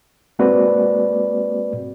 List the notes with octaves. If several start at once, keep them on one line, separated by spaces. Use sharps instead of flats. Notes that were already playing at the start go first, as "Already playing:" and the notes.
G#3 A#3 C4 F#4 B4 D5